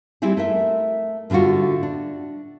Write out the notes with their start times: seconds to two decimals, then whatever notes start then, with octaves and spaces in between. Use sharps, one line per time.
0.22 G3 C4 E4 G4 G#4
0.37 A3 A#4 E5
1.30 A2 D3 G3 F4 F#4
1.83 D4